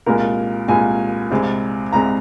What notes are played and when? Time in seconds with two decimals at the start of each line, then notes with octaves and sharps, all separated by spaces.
0.06 C2 A#2 G#3 A#4
0.68 C2 A#2 G#3 G#5
1.30 C2 C3 G#3
1.93 C2 C3 G#3 A#5